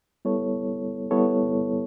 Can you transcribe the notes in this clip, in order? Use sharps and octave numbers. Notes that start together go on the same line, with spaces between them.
G3 B3 E4 A4 C#5
G3 B3 E4 A4 C#5